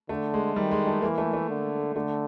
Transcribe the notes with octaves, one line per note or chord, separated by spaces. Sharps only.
D3 A3
G#3
D#3 G3
G#3
A3
E3 A#3
A3
A3
D3
D3 A3